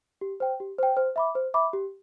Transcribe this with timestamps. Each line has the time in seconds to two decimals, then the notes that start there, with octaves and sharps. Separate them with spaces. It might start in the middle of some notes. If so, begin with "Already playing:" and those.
0.21 G4
0.40 C5 G5
0.60 G4
0.78 C5 G5
0.97 C5
1.16 E5 B5 D6
1.35 C5
1.54 E5 B5 D6
1.73 G4